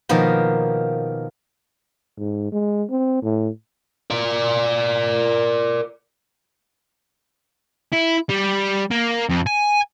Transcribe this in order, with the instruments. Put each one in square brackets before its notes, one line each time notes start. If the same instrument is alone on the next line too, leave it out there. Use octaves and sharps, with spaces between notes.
[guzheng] B2 D#3 F3 A#3 B3
[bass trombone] G#2
G#3
C4
A2
[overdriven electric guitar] A#4 D5
[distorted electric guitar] E4
G3
A#3
F2
G#5